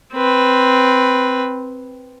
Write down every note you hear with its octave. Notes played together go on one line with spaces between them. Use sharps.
C4 B4